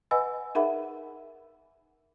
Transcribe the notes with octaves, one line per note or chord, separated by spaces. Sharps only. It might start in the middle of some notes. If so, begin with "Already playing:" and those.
B4 D#5 F#5 G#5 B5 E6
D#4 G#4 A#4 E5 F#5 B5